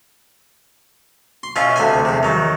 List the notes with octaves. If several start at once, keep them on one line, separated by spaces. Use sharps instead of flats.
C6
B2 C#4 F4 E5
D2 C3 F#5 G#5
E2 C3
D#3 F#3